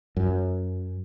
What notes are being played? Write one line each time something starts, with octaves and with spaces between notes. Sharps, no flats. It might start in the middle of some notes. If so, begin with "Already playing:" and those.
F#2